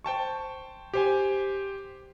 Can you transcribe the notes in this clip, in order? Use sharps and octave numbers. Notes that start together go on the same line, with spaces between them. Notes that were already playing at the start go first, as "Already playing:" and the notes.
C5 G5 A5 C#6
G4 C5 G#5